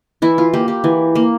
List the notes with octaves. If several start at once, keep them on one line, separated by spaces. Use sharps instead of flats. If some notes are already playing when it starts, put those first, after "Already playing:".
E3 E4
F4
A#3 G4
G4
E3
A#3